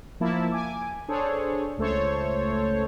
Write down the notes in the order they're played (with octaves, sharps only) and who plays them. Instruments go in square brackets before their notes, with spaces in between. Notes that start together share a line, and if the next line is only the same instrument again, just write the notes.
[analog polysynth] F3 A#3 E4 A5
G#5 D6
D4 G#4 A4 C5 C#5
C#2 A3 A4 C5 C#5